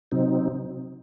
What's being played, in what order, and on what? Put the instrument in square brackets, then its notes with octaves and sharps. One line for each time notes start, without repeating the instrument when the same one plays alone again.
[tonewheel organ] C3 F#3 C4 D#4